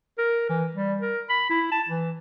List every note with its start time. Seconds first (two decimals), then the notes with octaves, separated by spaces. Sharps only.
0.18 A#4
0.49 E3
0.75 G3
1.02 A#4
1.30 B5
1.50 E4
1.72 A5
1.89 E3